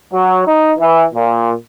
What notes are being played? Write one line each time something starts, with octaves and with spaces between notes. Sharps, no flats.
F#3
D#4
E3
A#2